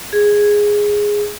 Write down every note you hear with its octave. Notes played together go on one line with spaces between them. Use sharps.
G#4